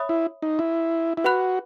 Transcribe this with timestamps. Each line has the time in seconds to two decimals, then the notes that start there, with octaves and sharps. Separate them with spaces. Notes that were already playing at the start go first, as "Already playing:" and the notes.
Already playing: C#5 E5 B5 D#6
0.09 E4
0.42 D#4
0.59 E4
1.17 E4
1.24 F#4 B4 F#5 B5 F#6